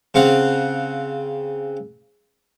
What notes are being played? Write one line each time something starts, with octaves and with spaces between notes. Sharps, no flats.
C#3 C4 F5 F#5